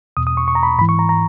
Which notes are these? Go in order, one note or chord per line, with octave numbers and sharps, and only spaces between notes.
E2 B2 D#6
D#6
C#6
C#6
A#5
B5
G#2 E3 B5
C#6
A#5
A#5